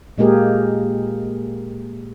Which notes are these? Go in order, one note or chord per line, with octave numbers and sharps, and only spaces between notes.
A#2 G#3 A#3 G4 G#4 A#4